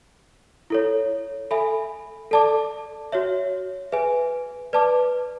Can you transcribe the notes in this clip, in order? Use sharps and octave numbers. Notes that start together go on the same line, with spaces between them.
E4 A4 C#5
A4 E5 G#5 B5
A4 D5 A5 D6
F#4 C#5 E5
G#4 B4 E5 G#5
B4 D5 A5 D6